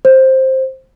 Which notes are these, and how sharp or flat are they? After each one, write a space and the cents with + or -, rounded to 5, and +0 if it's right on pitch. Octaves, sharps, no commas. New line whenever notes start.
C5 +10